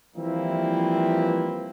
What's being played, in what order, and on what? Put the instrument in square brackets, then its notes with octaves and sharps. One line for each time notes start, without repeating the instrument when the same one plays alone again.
[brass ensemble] E3 F3 G3 A#3 C4 E4